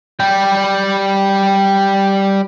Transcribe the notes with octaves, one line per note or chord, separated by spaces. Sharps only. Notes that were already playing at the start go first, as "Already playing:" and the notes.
G3 G5